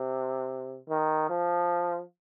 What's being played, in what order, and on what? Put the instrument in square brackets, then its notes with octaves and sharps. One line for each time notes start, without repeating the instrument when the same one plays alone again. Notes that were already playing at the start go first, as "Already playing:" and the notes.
Already playing: [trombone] C3
D#3
F3